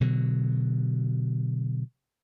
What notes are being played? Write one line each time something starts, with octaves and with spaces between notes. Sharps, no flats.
B2 D3 F#3